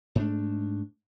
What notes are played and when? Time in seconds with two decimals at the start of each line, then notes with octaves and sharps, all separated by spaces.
0.15 G#2 A3 D4